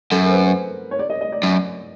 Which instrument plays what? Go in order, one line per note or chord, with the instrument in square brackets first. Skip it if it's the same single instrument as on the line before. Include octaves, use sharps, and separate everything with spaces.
[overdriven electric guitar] F#2 [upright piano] A4
[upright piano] A#4
C5
B4
C5
C#5
D5
D#5
D#5
D5
[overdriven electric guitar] F#2